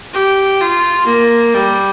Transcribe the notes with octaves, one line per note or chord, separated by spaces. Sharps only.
G4
F4
A#3
G3